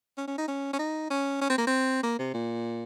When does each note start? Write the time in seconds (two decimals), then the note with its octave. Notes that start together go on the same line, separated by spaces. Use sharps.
0.17 C#4
0.27 C#4
0.38 D#4
0.48 C#4
0.73 C#4
0.79 D#4
1.10 C#4
1.41 C#4
1.50 C4
1.58 A#3
1.67 C4
2.03 A#3
2.19 C3
2.34 A#2